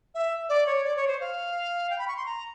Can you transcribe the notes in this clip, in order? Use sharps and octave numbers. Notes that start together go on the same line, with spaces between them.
E5
D5
C#5
D5
C#5
C5
F5
G5
B5
C#6
C6
A#5